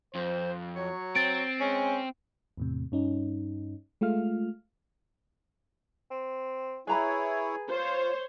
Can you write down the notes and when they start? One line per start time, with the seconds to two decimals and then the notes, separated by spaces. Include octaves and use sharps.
0.15 F2 C5
0.76 F#3 C#5
1.15 C4 A6 D7
1.60 G#3 C#4
2.57 E2 A2 C3
2.92 G2 C#4 D#4
4.01 G#3 A3 F4 F5 F6
6.11 C4
6.87 E4 G#4 B4 C#5 A#5 B5
7.69 F4 C5 C#5